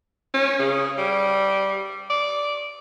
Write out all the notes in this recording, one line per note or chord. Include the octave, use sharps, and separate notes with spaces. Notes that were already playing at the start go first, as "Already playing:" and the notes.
C#4
C#3
G3
D5